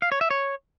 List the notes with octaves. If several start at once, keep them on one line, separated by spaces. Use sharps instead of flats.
F5
C#5
E5
C#5